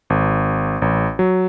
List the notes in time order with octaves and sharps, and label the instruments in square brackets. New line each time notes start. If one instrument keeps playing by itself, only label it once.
[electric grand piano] G#1
A1
F#3